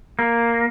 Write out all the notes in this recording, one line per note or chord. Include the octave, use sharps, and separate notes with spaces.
A#3